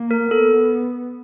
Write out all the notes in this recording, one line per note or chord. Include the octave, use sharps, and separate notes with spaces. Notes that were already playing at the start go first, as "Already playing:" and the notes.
Already playing: A#3
A#4
B3 A4